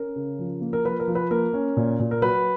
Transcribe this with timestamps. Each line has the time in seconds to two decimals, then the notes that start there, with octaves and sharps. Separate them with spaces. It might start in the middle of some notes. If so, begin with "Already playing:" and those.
Already playing: C#4 A#4
0.16 C#3
0.39 F3
0.61 A#3
0.73 A#4
0.85 F3 B4
1.00 A#4
1.08 F3
1.15 B4
1.31 A#3 A#4
1.54 C#4
1.77 A#2
2.00 A#2
2.11 A#4
2.22 F#3 B4